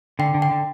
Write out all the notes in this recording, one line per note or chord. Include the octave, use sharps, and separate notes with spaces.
D3 G5
D3
G5
D3